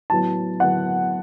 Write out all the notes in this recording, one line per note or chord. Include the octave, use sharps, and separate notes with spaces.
A2 F#3 B3 A5
A2 F#3 B3 F#5